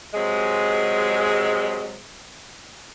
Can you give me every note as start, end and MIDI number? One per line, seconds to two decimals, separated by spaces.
0.14 2.01 48
0.14 2.01 54
0.14 2.01 56